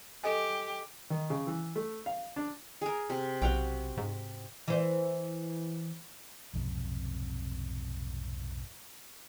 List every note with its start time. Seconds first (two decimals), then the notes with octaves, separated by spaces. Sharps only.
0.24 G4 A4 D#5 G#5
1.10 D#3
1.30 C#3
1.47 E3
1.76 A3
2.06 F5
2.36 D4
2.81 G#4 A#4
3.10 C3
3.42 B1 F#4 F5 G5
3.97 G#2
4.68 E3 C5
6.54 B1 F2 G#2 C3